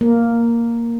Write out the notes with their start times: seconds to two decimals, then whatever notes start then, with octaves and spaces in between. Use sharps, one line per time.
0.01 A#3